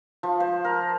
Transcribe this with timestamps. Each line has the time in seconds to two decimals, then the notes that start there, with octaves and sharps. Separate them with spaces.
0.23 F3
0.40 C5
0.65 A#4